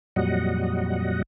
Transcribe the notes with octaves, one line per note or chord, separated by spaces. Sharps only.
F2 A#2 F#3 G3 D#5 F#5